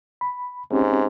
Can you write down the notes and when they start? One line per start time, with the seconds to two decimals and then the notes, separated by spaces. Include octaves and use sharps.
0.21 B5
0.71 G#2 C4 C#4 G4